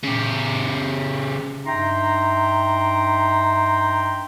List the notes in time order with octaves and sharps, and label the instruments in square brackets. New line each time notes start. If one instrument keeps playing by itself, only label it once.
[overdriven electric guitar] C#3 G4
[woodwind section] G2 D#4 E5 G5 A#5 C6